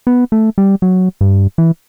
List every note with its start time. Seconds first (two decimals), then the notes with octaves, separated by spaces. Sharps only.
0.07 B3
0.32 A3
0.58 G3
0.82 F#3
1.21 G2
1.58 E3